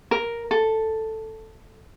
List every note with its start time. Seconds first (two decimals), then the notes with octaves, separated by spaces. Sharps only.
0.11 A#4
0.51 A4